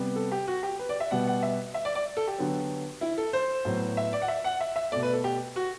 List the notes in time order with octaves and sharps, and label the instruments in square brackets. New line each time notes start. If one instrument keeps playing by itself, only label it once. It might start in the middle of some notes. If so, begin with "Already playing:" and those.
Already playing: [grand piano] C3 G3 B3
A4
G4
F#4
G4
B4
D5
E5
B2 G3 B3 F#5
F#5
E5
E5
D5
D5
A4
G4
D3 F#3 B3
E4
A4
C5
A2 F#3 B3
E5
D5
F#5
E5
F#5
E5
E5
A3 D5
B2
B4
A4
G4
F#4